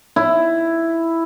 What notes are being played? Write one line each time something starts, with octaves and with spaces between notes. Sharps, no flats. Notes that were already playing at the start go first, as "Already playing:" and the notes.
E4